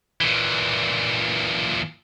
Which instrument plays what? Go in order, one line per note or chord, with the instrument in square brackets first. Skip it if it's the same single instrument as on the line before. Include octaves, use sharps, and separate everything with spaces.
[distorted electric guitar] A#2 E3